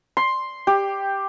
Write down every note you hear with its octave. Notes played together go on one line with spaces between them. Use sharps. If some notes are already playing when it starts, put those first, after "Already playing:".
C6
G4